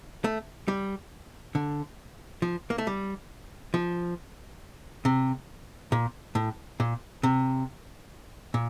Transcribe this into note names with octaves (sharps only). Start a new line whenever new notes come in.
A3
G3
D3
F3
A#3
A3
G3
F3
C3
A#2
A2
A#2
C3
A#2